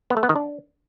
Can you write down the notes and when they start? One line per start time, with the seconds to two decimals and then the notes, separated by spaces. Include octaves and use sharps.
0.10 B3
0.17 A3
0.23 B3
0.29 D#3
0.36 D4